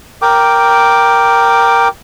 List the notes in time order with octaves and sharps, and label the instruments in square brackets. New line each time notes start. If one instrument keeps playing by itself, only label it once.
[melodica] A#4 G5 D6